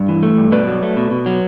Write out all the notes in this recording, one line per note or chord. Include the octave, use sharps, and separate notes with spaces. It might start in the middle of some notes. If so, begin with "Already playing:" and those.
Already playing: G2
E3
A3
G2
B2 B4 D5
F#3
A3
B2
B2
F#3